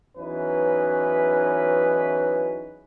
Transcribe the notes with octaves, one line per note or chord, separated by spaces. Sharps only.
E2 E3 F#3 C#4 D#4 B4